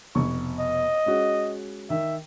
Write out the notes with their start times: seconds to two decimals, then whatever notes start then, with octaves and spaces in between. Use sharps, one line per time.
0.15 F1 B2 C#6
0.60 D#5
1.06 G#3 C#4 F#4
1.90 D#3 E5